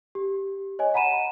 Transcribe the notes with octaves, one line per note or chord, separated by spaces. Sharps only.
G4
C#5 D#5 G#5
F#5 A#5 B5 D#7 E7